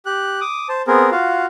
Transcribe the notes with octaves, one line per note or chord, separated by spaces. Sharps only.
G4 F#6
D6 D#6
C5 A5
B3 C4 G#4 A#4
F4 F#4 F5